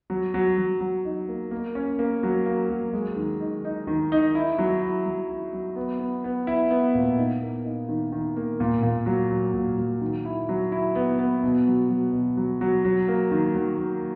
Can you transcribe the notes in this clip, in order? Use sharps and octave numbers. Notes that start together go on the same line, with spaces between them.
F#3
F#3
F#3
F#3
D#4
A#3
A#3
C#4
A#3
F#3
A#3
F#3
G#3
D#3
D#4
D#4
D#3
D#4
E4
F#3
E4
F#3
E4
F#3
B3
B3
B3
E4
B3
A#2
D#4
A#3
D#4
D#3
D#3
A#3
A#2
A#2
F#3
F#3
A#2
F#3
D#3
E4
F#3
E4
B3
B3
B2
F#3
F#3
B2
F#3
F#3
F#3
A#3
D#3
F#3
A#3